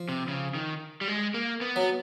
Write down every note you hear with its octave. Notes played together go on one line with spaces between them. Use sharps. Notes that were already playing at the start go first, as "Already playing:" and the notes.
Already playing: F3
C3
C#3
D#3
G3
G#3
A#3
B3
F#3 B3